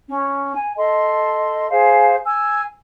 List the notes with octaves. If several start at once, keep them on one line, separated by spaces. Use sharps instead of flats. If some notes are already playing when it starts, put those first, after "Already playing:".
C#4
G#5
A4 D#5 C6
G#4 C5 F5
G#5 E6